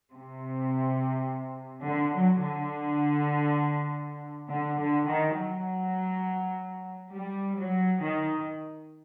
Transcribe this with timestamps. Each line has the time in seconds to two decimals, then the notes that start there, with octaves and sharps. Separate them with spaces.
0.10 C3
1.86 D3
2.15 F#3
2.45 D3
4.50 D3
4.79 D3
5.08 D#3
5.38 F#3
7.14 G3
7.58 F#3
8.02 D#3